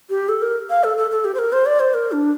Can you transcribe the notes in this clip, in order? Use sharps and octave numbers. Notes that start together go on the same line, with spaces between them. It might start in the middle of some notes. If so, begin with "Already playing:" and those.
G4
A4
A#4
F5
A4
A4
A4
G4
C5
A#4
C5
D5
C5
A#4
D4